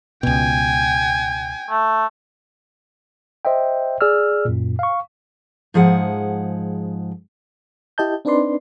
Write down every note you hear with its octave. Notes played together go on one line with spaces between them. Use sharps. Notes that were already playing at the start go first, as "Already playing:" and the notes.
C#2 B2 G5 G#5
A3
C5 D#5 E5 G5
G#4 D5 E6 F6
F#2 A#2
F5 C#6
G#2 F3 G#4 F#5
E4 G4 D#5 A5 G6
C4 D4 D#4 B4 D5 C6